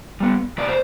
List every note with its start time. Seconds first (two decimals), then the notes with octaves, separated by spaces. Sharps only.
0.20 G3 B3
0.58 C3 B4 D5
0.68 C5